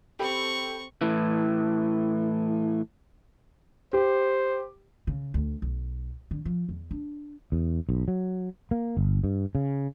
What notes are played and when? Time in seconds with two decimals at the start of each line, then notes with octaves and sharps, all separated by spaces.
0.19 C4 G4 A4 B5 C#6
1.01 A2 E3
3.93 G4 C5
5.07 C#3
5.34 D2
5.62 B1
6.31 D3
6.45 F3
6.69 E2
6.91 D4
7.52 E2
7.89 B1
8.08 F#3
8.71 A#3
8.97 G1
9.24 G2
9.55 C#3